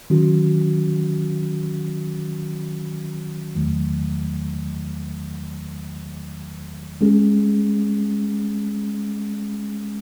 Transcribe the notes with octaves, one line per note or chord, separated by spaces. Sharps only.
D#3 F#3 C#4 F#4
E2 D#3 F#3 A3
G#3 C#4 G#4